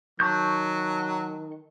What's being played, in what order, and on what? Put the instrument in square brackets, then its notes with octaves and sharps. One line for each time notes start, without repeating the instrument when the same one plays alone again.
[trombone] D#3 [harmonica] F#3 [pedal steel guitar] A5 C#6 G6